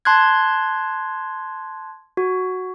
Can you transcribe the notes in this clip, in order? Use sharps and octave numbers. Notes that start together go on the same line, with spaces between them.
A5 C6 F#6 G#6
F#4